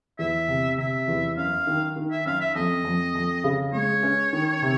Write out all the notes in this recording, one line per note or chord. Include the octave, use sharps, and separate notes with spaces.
E2 E5
C3
C3 E5
E2
F#2 F5
D#3
D#3
E5
F#2 F5
E5
F2 D#5
F2
F2
C#3
G#3 C#5
C#4
D#3
C3